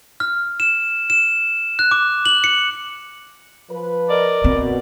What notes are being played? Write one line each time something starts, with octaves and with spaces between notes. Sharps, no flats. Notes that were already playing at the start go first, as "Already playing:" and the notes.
F6
E7
E7
F#6
D6
F#7
C#7
F3 B4
A#4 D5 D#5
B2 C4